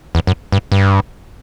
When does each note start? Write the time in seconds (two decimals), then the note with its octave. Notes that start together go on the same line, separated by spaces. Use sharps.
0.15 E2
0.27 F#2
0.52 G2
0.72 G2